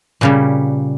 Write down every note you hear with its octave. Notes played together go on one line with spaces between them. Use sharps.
A#2 C#3 G3